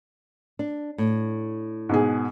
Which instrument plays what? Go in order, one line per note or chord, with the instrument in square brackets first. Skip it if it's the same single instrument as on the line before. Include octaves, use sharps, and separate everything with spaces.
[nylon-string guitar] D4
A2
[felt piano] G#2 B2 G#4